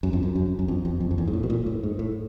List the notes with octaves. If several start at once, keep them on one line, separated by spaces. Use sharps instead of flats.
F#2
F2
F#2
F#2
F#2
F2
F2
F2
F2
E2
G#2
A2
B2
A#2
A2
G#2
A2